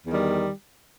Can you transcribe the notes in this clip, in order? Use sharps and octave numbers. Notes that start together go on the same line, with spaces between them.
E2 D#3 G3